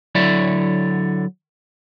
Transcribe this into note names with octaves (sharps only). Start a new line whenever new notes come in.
D3 F#3 E4 C#5 D5 E5